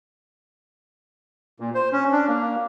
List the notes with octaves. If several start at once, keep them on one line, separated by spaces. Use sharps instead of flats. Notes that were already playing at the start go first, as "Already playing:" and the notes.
A#2
C5
C#4
D4
A#3